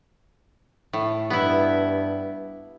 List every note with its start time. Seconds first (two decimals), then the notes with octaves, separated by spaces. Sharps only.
0.93 A2
1.30 G2 B3 E4